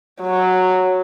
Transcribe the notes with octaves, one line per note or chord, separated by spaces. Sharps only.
F#3